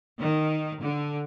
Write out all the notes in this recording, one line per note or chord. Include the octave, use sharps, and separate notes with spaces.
D#3
D3